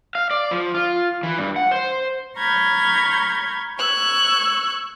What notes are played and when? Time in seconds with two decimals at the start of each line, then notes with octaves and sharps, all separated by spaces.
0.15 F5
0.31 D5
0.51 F3
0.74 F4
1.23 E3
1.38 G2
1.56 F#5
1.71 C5
2.38 A#5 B5 C#6 F6 G6 G#6
3.79 C#6 E6 F#6 G#6